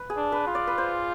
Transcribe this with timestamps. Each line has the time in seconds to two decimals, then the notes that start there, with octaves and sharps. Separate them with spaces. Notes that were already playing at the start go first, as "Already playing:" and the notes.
Already playing: B4
0.10 G#4
0.17 D4
0.32 B4
0.47 F4
0.55 D5
0.67 B4
0.78 C5